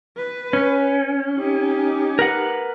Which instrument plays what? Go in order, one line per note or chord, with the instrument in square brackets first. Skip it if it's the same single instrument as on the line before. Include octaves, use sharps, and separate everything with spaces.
[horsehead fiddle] B4
[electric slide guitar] C#4
[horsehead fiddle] D#4 G4
[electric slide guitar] A#4 B4 F#5